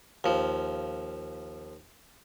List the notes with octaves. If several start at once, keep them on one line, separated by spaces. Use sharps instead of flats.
D#2 F3